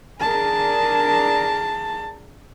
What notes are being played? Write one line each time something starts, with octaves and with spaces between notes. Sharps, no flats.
D4 G#4 A#4 A5